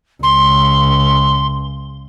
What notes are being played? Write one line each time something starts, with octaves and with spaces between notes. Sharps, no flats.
C#2 C6